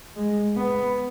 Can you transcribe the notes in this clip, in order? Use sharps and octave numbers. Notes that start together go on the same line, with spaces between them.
G#3
B3